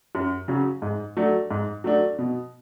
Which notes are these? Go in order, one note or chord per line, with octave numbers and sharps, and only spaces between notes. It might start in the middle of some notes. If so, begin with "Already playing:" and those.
F#2
C#3 F#3 C#4
G#2
F#3 A3 D4
G#2
F#3 A3 D4
B2